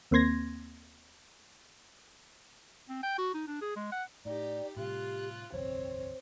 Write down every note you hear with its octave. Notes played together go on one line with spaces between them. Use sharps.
D#2 A#3 C4 C6 G#6 A#6
C4
G5
F#4
D#4
D4
G#4
G#3
F#5
A2 D#4 G4 D5
A2 C3 G3 F4 G4 F#6
F#1 B1 E2 C4 C5 C#5